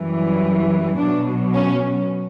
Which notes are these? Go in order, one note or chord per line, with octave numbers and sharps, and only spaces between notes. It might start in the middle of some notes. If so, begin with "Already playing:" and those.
Already playing: F#2 E3 G3
B2 F#3 D4
C#4